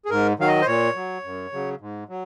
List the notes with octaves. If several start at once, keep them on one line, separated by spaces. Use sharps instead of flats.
G#4
G#2 A#4
D#3 F#3 F5
D#5
C5
A#2 C#5
F#3
F#2
C#3 F#3
G#2
F#3